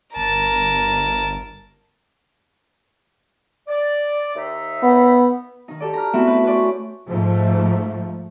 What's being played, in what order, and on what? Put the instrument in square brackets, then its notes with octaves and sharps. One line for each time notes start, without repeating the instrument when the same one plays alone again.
[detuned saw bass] G1 [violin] A#4 A5
[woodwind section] D5
D#2 D#4 E5
[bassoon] B3
[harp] D#3 D#4
G4 A4 D5
A#5 F6
A3 B3 C4 E4 F#4 E5
B4
C#4 B4 C5 D5
[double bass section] G#2 F3 A3